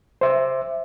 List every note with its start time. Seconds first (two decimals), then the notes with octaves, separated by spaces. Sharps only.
0.21 C5 E5